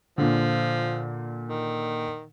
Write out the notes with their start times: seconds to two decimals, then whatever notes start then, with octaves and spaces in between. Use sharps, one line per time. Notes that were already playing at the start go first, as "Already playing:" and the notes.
0.18 A#2 D3 F3
1.48 D#3